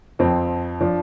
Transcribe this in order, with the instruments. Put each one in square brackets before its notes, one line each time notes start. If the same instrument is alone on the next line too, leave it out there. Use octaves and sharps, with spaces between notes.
[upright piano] F2 F3 C4
F3 D4